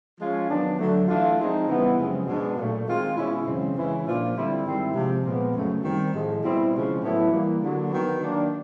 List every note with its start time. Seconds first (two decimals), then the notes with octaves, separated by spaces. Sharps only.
0.19 F3 G#3 C#4 F4
0.49 D#3 F#3 B3 D4
0.79 D3 F#3 A3
1.08 E3 A3 D4 F4
1.39 F3 G#3 C4 D#4
1.68 C#3 E3 G3 B3
1.98 F#2 C#3 F3 G#3 C4
2.27 B2 G#3 B3 D4
2.57 A#2 F#3 A3
2.86 D#3 G#3 C4 F4
3.16 B2 G#3 C#4 E4
3.46 F#2 C#3 E3 G#3 C4
3.76 C#3 E3 G#3 C#4 E4
4.06 A#2 F3 A#3 D4 F4
4.34 D3 G3 C4 E4
4.64 G#2 D#3 G3 C4 E4
4.94 C3 F3 G#3
5.24 A#2 F3 G#3 B3
5.54 F#2 C#3 F#3 A3
5.84 D#3 G3 C4
6.13 A2 F3 G#3
6.43 B2 G3 C4 E4
6.72 C#3 F3 G#3 C4 E4
7.02 A2 F#3 B3 E4
7.31 E3 G3 A#3
7.62 D3 F#3 A#3
7.91 D#3 F#3 B3
8.21 D#3 F#3 A#3 D4